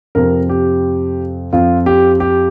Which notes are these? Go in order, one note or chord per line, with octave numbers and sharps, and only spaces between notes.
F2 C3 F3 C4 A#4
G4
F2 F3 C4 F4
G4
G4